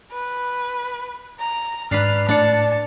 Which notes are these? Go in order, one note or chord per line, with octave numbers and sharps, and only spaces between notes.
B4
A#5
G#2 D4 B4 F6 C7
A2 D4 D5 A5 C#7